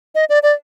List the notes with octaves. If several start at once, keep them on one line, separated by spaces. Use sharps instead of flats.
D#5
D5
D5